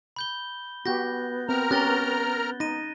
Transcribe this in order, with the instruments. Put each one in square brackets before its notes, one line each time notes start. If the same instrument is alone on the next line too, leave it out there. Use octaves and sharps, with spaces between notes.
[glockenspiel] B5 G6 G7
[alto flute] B3 [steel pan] F#4 G4 [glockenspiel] G6 A#6
[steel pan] C4 [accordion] A#4 A#5 F6
[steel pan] C#4 G4 [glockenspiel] F#6 A6 G7
[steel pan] D#4 [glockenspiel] A#6 D#7